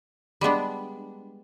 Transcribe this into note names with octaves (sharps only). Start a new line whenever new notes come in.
G3 G#3 B3 D4